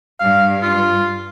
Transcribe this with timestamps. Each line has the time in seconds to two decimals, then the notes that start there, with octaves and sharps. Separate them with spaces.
0.20 G2 F5
0.63 F4